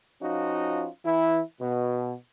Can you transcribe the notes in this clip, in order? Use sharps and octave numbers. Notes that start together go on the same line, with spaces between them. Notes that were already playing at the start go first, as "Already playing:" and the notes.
F3 C#4 D#4 F4 F#4
E3 E4
B2